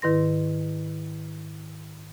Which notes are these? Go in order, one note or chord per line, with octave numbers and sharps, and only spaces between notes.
G#2 D#3 E4 B4 C6 A#6